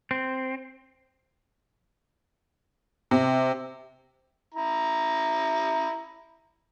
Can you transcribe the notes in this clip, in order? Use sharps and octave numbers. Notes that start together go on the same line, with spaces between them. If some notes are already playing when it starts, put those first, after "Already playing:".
C4
C3
E4 A#5